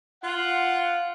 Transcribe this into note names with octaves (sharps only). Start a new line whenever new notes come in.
F4 F#5